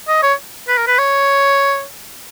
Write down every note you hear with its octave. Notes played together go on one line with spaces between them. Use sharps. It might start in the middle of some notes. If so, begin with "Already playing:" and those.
D#5
C#5
B4
A#4
B4
C#5